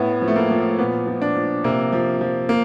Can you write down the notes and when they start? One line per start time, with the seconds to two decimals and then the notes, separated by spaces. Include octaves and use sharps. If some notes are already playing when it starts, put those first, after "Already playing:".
Already playing: A2 B3
0.22 F3
0.28 A3
0.36 A#3
0.51 F3
0.79 A#2 B3
1.07 F3
1.22 D4
1.35 F3
1.64 C3 A#3
1.93 F3
2.21 F3
2.49 A#3